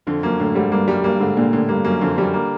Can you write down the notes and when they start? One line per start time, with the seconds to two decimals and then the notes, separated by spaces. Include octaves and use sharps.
0.07 F2 D3
0.23 F#2 A#3
0.39 A2 D3
0.55 G#2 G3
0.71 G2 A#3
0.87 F#2 G3
1.04 G2 A#3
1.20 G#2 D3
1.37 A#2 D3
1.53 A2 D3
1.69 G2 A#3
1.85 F#2 A#3
2.01 F2 D3
2.17 F#2 G3
2.34 A#3